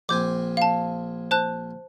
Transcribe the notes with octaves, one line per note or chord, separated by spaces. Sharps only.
A#1 C4 G#5 D6 G6
F5 A5
C5 A5 F#6